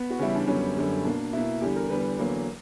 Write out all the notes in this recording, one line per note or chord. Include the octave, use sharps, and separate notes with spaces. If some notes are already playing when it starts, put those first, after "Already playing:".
Already playing: B3
F#4
C#3 E3 G3 E4
D4
F#2 D3 G3 B3 C#4
F#2 D3 G3 B3
B2 A#3 D4
B2 A#3 E4
E2 D3 G3 G4
A#4
E2 D3 G3 B4
E2 D3 F#3 A#3